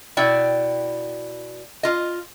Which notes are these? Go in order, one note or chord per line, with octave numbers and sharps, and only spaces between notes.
B2 E4 D5 G5
F4 D#5